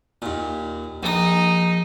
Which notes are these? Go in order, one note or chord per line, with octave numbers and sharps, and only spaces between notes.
D#2 A#2
A#1 D#4 D#6